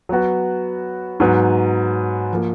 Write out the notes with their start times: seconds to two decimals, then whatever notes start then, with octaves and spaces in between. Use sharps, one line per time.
0.09 F#3 B3 F#4
1.20 G#2 F#3 B3
2.32 F3 A#3